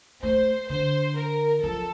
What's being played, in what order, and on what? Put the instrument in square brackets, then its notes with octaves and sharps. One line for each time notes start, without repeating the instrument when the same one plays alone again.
[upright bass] A3 [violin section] C5
[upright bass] D3 [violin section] C5
[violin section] A#4
[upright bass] F3 [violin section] A4